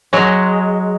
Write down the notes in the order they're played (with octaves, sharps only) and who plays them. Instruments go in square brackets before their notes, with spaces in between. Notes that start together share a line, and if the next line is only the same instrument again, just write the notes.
[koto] F#3 G#3